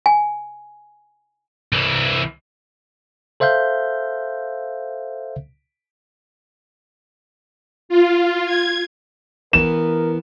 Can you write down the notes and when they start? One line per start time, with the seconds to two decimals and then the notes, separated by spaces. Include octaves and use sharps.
0.06 G#5
1.72 C2 E3
3.40 A4 C5 E5 F5 G6
7.89 F4
8.46 G#6
9.53 E3 B3 A#4 E7